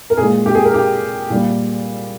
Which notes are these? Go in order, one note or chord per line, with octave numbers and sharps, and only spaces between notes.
A#4
A#2 G#3 G#4
G4
G#4
A#4
G4
A#2 G3